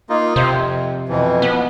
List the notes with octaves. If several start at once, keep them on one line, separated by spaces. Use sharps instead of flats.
A#3 D#4 F4
C3 C5
F2
F2 B2 E3
B3